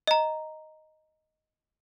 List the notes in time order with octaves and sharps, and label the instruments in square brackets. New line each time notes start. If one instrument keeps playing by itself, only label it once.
[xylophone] D#5 A#5